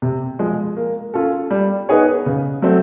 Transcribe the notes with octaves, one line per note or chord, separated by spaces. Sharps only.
C3
F3 G#3
A#3
C#4 F4 A4
G3
B3 D#4 G#4 C#5
C#3
F#3 A3 C4